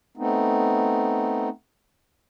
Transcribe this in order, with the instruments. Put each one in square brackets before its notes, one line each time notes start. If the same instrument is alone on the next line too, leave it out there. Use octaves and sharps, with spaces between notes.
[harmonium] A3 B3 C4 D#4